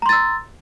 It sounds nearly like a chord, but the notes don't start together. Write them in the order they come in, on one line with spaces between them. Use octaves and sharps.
A#5 C6 A6 E6